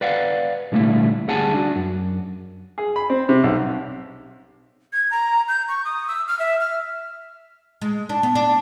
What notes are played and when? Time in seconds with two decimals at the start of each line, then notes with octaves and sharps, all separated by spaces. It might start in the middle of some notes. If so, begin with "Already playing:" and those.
0.01 B4 D5 F5 F#5
0.72 A#2 D3 G3 A3 A#3 E4
1.27 D2 G3 G#4 F#5 G#5 A5
1.54 D4 F#4
1.76 F#2
2.78 G#4
2.96 B5
3.10 C4
3.29 C3
3.44 B1
4.93 G#6
5.11 A#5
5.48 G6
5.68 C#6
5.85 D#6
6.08 E6
6.28 F6
6.39 E5
6.60 F6
7.81 G#3
8.09 D4
8.23 B3
8.35 D4